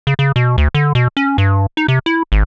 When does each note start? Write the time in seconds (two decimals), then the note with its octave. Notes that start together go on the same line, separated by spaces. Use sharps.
0.07 C#3
0.19 C#3
0.36 B2
0.58 D2
0.75 D3
0.95 B2
1.17 C#4
1.38 G2
1.77 D#4
1.88 C3
2.06 E4
2.32 G#1